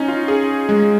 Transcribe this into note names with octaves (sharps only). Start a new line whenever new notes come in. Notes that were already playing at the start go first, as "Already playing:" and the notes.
Already playing: C#4 D#4
F4
G#4
G#3